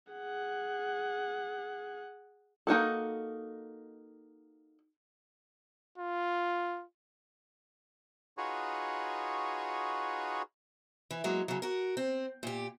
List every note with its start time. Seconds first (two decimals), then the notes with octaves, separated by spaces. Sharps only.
0.12 G#4 F#5
2.67 A#3 D#4 F#4 A4
5.98 F4
8.38 D#4 F4 F#4 G#4 B4 C#5
11.11 E3
11.24 F#3 G#3 A#3
11.48 C#3 F#3
11.62 F#4 A#4
11.97 C4
12.43 A#2 G4